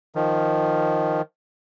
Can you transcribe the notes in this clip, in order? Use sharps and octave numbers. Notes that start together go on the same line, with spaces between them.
D#3 F3